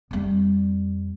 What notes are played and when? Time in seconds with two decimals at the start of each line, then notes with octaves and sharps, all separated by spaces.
0.11 F2 G3